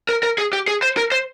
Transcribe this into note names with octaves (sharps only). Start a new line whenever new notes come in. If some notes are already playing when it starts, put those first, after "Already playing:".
A#4
A#4
G#4
G4
G#4
C5
A#4
C5